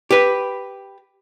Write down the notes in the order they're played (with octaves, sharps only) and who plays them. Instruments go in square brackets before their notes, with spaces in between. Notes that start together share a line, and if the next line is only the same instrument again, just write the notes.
[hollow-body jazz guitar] G4 B4